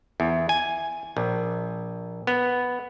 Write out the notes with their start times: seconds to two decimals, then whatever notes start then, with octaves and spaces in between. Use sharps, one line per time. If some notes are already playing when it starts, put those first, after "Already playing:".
0.20 E2
0.49 G#5
1.17 A#1
2.27 B3